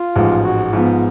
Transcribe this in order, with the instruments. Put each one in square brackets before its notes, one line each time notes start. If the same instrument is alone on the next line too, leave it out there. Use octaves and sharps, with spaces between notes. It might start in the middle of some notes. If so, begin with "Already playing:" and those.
Already playing: [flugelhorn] F4
[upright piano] A1 G#2 F3 G#3
[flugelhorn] F#4
[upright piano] G#2 F3 B3 [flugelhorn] F4